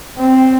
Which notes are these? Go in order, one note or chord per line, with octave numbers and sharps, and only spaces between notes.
C4